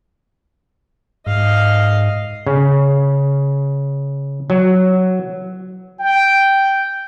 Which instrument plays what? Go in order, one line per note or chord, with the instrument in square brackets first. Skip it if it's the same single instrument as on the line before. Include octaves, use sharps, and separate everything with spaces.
[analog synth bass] G#2 [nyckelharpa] D#5 F5
[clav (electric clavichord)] C#3
F#3
[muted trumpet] G5